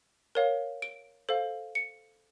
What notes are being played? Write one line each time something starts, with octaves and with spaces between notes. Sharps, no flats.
A#4 C#5 F5
D7
A4 C5 F5
C#7